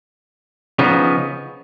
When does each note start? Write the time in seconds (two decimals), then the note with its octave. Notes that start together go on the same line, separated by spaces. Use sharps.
0.79 C#3 F3 B3 D#4